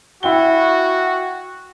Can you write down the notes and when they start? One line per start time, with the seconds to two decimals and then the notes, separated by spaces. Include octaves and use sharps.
0.23 E4 F#4 G5 G7